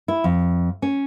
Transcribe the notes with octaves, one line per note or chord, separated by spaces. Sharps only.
E4
F2
C#4